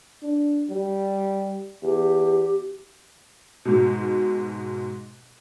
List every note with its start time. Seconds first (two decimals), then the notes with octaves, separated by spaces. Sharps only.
0.22 D4
0.70 G3
1.83 E2 G4
3.65 G#2 B2